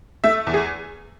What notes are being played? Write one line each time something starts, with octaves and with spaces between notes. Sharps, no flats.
A3 E5
E2
G#4